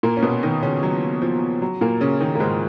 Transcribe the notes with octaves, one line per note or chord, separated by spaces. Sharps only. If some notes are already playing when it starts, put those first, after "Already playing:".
A#2 A#3
C#4
B2 B3
D#3 D#4
C#3 C#4
F#3
F3
F#3
A#2 A#3
C#3 C#4
D#3 D#4
A#3
G#2 G#3